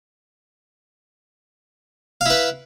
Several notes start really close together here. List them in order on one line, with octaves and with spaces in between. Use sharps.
F5 E4 B4